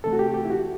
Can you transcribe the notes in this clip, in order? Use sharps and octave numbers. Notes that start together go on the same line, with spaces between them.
C3 E3 A3 A4
F#4
G4
G4
E4
F#4